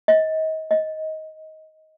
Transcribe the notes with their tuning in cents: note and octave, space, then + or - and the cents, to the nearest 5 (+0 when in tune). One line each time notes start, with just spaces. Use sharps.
D#5 +30
D#5 +15